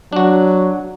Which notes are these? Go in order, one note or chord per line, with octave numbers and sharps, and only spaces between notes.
F#3 D4 F#4